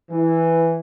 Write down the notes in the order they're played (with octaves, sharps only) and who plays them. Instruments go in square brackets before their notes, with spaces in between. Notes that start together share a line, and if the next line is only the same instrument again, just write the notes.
[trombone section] E3